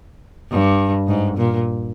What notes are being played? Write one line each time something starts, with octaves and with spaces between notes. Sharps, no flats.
G2
G#2
A#2